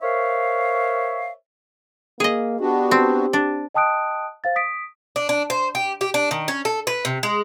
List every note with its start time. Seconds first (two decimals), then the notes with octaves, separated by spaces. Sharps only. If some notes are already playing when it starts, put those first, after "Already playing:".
0.02 A#4 C5 C#5 E5 F5
2.20 A#3 G#4 D#5
2.61 B3 D4 F#4 G4
2.91 C4
3.33 D4
3.74 D#5 G5 A5 D#6 F#6 D7
4.44 C5 F5 A6
4.56 D#6 B6 D7
5.16 D4
5.29 D4
5.50 C5
5.75 G4
6.01 G4
6.14 D4
6.31 D#3
6.48 C#4
6.65 A4
6.87 B4
7.05 C3
7.23 G#3